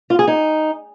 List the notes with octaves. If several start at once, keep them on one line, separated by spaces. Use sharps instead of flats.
F4
G#4
D#4